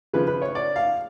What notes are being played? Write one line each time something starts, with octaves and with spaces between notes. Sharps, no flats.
C#3 F3 B4
B4
C#5
D5
F5